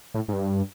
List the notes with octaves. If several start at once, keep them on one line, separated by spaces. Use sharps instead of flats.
A2
G#2
G2